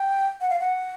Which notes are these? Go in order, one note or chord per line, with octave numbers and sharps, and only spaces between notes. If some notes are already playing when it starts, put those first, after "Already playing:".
Already playing: G5
F#5
F5
F#5